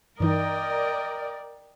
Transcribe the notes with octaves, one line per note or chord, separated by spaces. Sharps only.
G2 E3 D#4 A#4 D5 D#5 G5